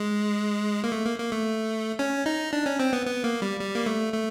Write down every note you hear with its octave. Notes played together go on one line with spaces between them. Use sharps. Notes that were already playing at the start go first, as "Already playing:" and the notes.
Already playing: G#3
A#3
A3
A#3
A#3
A3
C#4
D#4
D4
C#4
C4
B3
B3
A#3
G3
G3
A#3
A3
A3